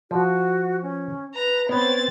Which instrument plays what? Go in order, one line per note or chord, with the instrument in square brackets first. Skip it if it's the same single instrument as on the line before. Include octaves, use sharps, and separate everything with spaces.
[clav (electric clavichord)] F3 [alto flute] F#4
[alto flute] C#4
[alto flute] B4 [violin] A#5
[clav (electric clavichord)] B3 [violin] C4 A6 [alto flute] C#5